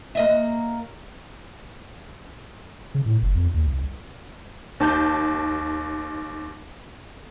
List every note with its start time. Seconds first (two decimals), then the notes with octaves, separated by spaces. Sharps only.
0.15 A#3 D#5 E5
2.95 C#3
3.06 A2
3.22 F#1
3.35 F2
3.54 D#2
3.67 C2
4.80 D#2 A5 G6